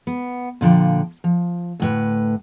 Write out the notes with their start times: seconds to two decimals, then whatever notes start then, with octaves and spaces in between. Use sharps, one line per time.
0.07 B3
0.61 A#2 D3 F3 G5
1.24 F3
1.80 D2 A2 B4